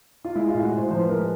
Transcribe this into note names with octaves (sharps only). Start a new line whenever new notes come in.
F4
G#3 E4
F4
A2
F#4
A2 C5
F3 C5
B4
G#3 A#4
B4